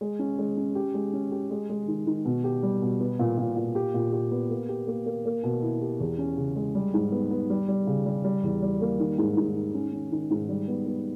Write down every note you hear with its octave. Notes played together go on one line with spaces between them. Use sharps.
G#3
C#4
G#3
C#4
G4
G#3
C#4
G4
G#3
G#3
D#3
D#3
B2
G4
G3
B2
B3
A#2
A#2
A#2
G4
A#2
G4
B3
A#3
G4
A#3
A#3
A#3
B2
E4
G4
E2
C#4
C#3
G#3
G3
G#2
B3
B3
G3
G3
C#3
G3
G3
E2
G3
A#3
D#3
G#2
G#2
D#3
C#4
C#4
D#3
G#2
G3
B3
B3